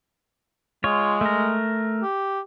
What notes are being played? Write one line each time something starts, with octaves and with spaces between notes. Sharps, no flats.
G#3 F4 C#5
A3 A#4
G4